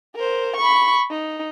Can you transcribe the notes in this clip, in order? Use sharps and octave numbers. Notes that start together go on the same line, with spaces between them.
A#4 C5
B5 C#6
D#4